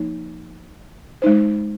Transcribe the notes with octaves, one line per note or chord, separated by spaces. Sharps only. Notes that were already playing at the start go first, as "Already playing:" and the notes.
Already playing: F3 A#3 D#4
G#3 D#4 C5